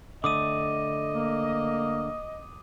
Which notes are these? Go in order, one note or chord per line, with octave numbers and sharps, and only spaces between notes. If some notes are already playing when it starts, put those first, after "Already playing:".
D3 A3 D#5 D6 D#6 D#7
A#3